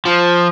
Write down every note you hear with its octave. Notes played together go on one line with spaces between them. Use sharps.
F3